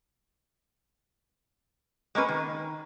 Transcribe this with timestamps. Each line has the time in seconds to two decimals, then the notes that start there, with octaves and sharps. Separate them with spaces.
2.15 G#3 A#3 C#4 B4
2.29 D#3